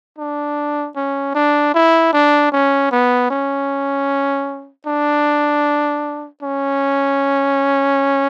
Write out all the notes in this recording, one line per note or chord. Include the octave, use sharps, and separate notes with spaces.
D4
C#4
D4
E4
D4
C#4
B3
C#4
D4
C#4